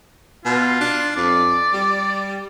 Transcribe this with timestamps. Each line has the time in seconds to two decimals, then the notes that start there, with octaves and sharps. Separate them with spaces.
0.45 B2 F4
0.81 D4
1.17 F2 D5
1.74 G3